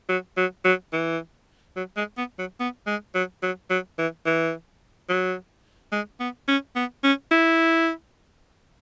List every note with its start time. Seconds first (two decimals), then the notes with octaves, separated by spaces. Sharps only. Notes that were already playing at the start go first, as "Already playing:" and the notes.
0.09 F#3
0.37 F#3
0.65 F#3
0.93 E3
1.76 F#3
1.97 G#3
2.17 B3
2.39 F#3
2.60 B3
2.87 G#3
3.15 F#3
3.43 F#3
3.70 F#3
3.98 E3
4.26 E3
5.09 F#3
5.92 G#3
6.20 B3
6.48 C#4
6.76 B3
7.04 C#4
7.32 E4